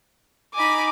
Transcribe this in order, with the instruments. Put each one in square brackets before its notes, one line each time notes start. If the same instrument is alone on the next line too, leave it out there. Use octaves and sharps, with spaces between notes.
[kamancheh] D#4 D6 [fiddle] G#5 B5